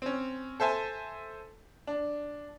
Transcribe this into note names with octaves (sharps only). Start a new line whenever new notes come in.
C4 C#4
A4 C5 E5 G#5 A5
D4